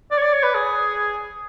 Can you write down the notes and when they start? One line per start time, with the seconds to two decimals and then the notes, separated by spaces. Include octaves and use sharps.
0.11 D5
0.18 C#5
0.22 D5
0.33 C#5
0.43 B4
0.54 G#4